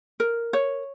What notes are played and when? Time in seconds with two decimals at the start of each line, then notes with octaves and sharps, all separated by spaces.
0.20 A#4
0.53 C#5